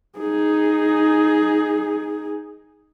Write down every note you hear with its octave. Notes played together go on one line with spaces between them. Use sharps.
D#4 G#4